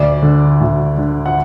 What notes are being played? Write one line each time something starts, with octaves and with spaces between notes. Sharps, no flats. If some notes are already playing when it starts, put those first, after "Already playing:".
Already playing: D2 D5
D3
D2
D3
F#5